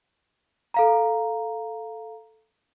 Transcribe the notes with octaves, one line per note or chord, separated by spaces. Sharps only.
A4 F5 A#5